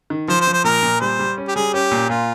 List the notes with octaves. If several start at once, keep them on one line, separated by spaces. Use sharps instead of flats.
D#3
F3 C5
C5
F3
C5
A#2 A#4
A#2
G3 C5
G3
C#4
G4
G3 G#4
C#4 G4
A#2
A#2 F4